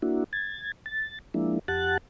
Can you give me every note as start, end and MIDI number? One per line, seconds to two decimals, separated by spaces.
0.02 0.24 58
0.02 0.24 62
0.02 0.24 64
0.02 0.24 66
0.33 0.72 92
0.33 0.72 93
0.86 1.19 93
1.34 1.59 53
1.34 1.59 56
1.34 1.59 58
1.34 1.59 62
1.34 1.59 64
1.68 1.98 41
1.68 1.98 67
1.68 1.98 78
1.68 1.98 81
1.68 1.98 90
1.68 1.98 93